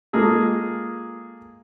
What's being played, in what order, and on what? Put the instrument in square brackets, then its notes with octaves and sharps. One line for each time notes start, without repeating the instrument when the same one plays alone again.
[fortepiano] G#3 A#3 F4 G#4 A4